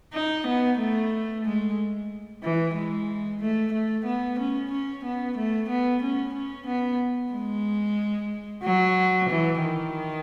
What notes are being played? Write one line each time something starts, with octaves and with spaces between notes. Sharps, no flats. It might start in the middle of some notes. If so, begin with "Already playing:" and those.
D#4
B3
A3
G#3
E3
G#3
A3
A3
B3
C#4
C#4
B3
A3
B3
C#4
C#4
B3
G#3
F#3
E3
D#3